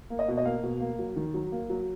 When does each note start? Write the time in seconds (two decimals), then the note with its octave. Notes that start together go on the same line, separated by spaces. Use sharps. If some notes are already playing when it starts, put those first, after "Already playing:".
0.10 A#3
0.19 D#5
0.28 B2
0.37 D#5
0.45 A#3 F5
0.63 B2
0.80 A#3
0.99 F#3
1.16 D#3
1.34 F#3
1.52 A#3
1.70 F#3